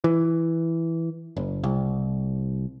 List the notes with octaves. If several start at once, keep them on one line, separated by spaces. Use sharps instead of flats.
E3
F#1
C2